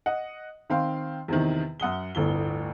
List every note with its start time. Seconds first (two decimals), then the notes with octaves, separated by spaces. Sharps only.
0.06 D#5 F#5
0.70 D#3 C4 F5 G5 C6
1.28 E2 C3 D#3
1.80 F#2 F#5 D#6 G7
2.15 G1 D2 A2 G7